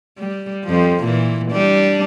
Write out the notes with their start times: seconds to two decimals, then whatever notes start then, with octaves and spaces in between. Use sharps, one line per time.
0.19 G3
0.64 F2 F3
1.04 A#2 E3
1.52 G3 D4